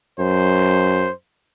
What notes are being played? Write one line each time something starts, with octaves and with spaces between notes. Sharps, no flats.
F#2 C5